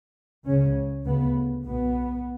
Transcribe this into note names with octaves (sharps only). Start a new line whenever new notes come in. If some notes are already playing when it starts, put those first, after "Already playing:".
C#2 C#3 C#4
D2 C#3 B3
B1 B2 B3